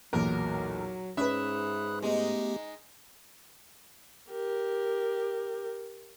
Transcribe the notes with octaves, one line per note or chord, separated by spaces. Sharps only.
B1 E2 A#2 F#3 A#4
G#2 C#4 B4 E5 B5 D#6 F#6
G#3 A3 B3 D#4 G4
G4 A#4